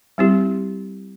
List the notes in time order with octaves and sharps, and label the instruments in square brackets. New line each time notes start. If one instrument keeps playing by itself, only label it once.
[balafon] G3 C4 E4 G4